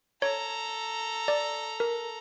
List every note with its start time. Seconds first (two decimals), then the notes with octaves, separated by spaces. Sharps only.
0.22 A4 C#5 A#5
1.28 D5
1.80 A#4